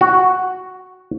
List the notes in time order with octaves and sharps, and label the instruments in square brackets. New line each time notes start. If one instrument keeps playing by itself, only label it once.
[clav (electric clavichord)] F#4